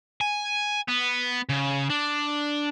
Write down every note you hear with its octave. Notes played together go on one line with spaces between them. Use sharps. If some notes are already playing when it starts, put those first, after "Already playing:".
G#5
B3
C#3
D4